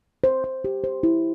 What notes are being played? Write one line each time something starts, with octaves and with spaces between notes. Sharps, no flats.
C5
C5
G4
C5
E4